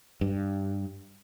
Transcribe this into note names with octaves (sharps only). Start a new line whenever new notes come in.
G2